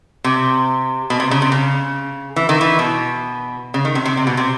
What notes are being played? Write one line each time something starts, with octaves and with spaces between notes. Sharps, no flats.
C3
B2
C3
C#3
C3
C#3
E3
D#3
E3
B2
C#3
D#3
C3
C3
C3
B2
C3